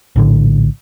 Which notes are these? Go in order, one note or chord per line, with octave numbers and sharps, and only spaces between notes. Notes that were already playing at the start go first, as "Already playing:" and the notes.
A#1 A2 D3